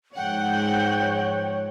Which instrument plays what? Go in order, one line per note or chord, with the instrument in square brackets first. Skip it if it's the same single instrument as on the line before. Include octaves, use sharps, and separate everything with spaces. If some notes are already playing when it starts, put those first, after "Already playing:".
[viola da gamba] G#2 F3 [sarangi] C#5 [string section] F#5 [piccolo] G5